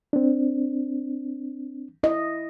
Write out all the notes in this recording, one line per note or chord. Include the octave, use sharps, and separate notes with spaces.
C4 D4
E4 D#5